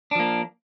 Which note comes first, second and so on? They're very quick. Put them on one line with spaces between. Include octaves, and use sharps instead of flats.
D4 F3 A#3